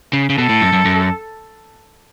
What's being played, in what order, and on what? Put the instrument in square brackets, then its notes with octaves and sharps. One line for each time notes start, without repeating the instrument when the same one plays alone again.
[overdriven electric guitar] C#3
C#3
[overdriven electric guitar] B2 [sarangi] A4
[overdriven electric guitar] A2
F#2
F#2
F#2